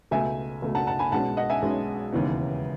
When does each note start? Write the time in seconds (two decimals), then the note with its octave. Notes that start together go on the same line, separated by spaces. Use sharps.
0.11 C#2 B2 A3 E5 G#5
0.62 C#2 B2 A3
0.75 F#5 A5
0.87 F#5 A5
0.99 G#5 B5
1.12 B1 B2 G#3 C#4 F#5 A5
1.37 D#5 F#5
1.50 E5 G#5
1.62 B1 B2 G#3 C#4
2.12 E1 D#2 C#3 E3 B3